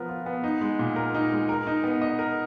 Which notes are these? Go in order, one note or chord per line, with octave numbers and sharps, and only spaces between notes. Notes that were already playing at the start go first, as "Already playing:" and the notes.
Already playing: F3 B3 A#4
F4
B3
D#4
G#3
A#2
A#4
D#4
G#3
A#4
D#4
B3
D#5
A#4